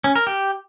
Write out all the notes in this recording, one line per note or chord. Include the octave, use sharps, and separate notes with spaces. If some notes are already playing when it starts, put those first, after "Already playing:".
C#4
A#4
G4